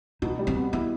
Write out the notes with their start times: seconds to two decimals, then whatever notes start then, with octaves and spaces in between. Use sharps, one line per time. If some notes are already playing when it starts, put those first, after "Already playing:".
0.22 B2 D#4
0.39 G3
0.47 C4
0.55 B3
0.72 B3 E4